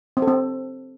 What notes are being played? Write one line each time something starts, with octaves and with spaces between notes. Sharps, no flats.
C4
A4
C4